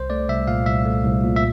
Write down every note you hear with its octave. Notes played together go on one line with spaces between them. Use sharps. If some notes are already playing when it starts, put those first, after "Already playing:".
Already playing: C2 C5
A3 D5
C2 E5
A#2 F5
C2 E5
A3
C2
A#2
E5